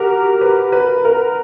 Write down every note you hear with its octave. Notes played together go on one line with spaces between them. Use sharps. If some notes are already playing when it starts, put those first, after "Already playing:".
Already playing: F#4 G4 A#4
B4
B4
A#4